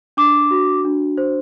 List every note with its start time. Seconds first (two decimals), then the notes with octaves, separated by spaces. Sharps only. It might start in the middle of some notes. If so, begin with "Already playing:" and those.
0.17 D4 D6
0.51 F#4
0.85 D4
1.18 C5